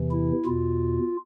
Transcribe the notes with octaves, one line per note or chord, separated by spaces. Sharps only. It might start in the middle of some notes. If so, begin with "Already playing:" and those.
Already playing: E2 C3 E3
E4
E2 B2 F4